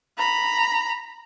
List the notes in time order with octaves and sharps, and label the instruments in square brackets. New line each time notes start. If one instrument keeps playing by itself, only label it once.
[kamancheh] A#5 B5